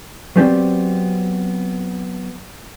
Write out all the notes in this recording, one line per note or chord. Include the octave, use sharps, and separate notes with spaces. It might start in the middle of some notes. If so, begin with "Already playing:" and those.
F#3 B3 C4 G4 D5